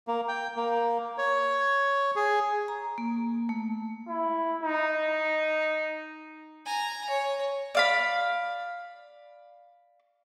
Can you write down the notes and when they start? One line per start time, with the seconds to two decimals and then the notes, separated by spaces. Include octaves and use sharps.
0.08 A#3
0.28 G5
0.56 A#3
1.18 C#5
2.16 G#4
2.68 A#5
2.98 A#3
3.49 A3
4.08 E4
4.63 D#4
6.65 G#5 A#5
7.09 C#5
7.75 D5 F5 B5